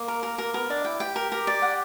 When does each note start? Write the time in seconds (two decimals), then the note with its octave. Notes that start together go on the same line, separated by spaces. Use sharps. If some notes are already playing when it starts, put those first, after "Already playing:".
Already playing: A#3
0.08 A#4
0.23 A#4
0.38 A#3 A#4
0.54 B3 A#4
0.70 D4 D5
0.85 E4 G5
1.00 G4 G5
1.16 A#4
1.32 A#4
1.47 D5
1.62 F#5